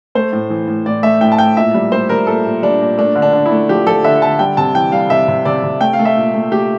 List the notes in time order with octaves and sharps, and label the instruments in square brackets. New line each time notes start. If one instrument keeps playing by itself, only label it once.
[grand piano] A3 C5
A2
E3
A2
A2 D5
A3 E5
A2 G5
A5
A2 G5
A#2 E5
G3
G3 C5
G3 A#4
A#2 A4
A#2
G3 D4
A#2
A3 D4
D3
D4
D3
E4
A3
F3 G4
F3 A4
D3 E5
D3 A5
G3 G5
C3 A5
E3 G5
G3 F5
C3 E5
C3
C3 D5
C3
A3 G5
F5
A3
E5
A#2
A3
A3 G4